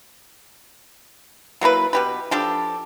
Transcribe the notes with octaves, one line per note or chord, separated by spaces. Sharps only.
F#3 A#3 E4 B4
B2 G4 B4
F3 D4 G4 A4